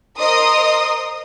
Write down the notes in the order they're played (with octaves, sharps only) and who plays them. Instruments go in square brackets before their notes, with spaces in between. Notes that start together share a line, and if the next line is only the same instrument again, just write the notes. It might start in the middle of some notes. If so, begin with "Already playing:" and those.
[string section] A#4 C5 D#5 C6 D#6